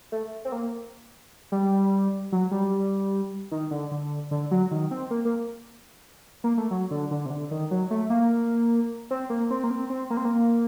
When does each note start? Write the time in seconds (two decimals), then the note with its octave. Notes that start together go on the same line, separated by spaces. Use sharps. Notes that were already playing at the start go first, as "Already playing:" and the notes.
0.12 A3
0.45 C4
0.52 A#3
1.52 G3
2.32 F#3
2.51 G3
3.52 D#3
3.71 D3
3.91 D3
4.31 D3
4.51 F#3
4.71 D#3
4.91 C4
5.11 A#3
5.25 A#3
6.44 A#3
6.58 A3
6.71 F#3
6.91 D3
7.11 D3
7.26 C3
7.30 D3
7.51 D#3
7.71 F#3
7.91 A3
8.10 A#3
9.11 C4
9.30 A#3
9.50 C4
9.64 A#3
9.71 C4
9.90 C4
10.10 A#3
10.17 C4
10.25 A#3